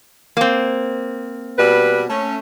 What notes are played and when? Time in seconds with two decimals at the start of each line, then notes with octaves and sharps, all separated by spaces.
0.37 A#3 C4
1.58 B2 G3 B4
2.09 A3 C#4